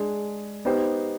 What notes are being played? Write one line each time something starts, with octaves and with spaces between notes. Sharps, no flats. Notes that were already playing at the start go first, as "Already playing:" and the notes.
Already playing: G#3 D4 G#4
B3 D#4 G4 C5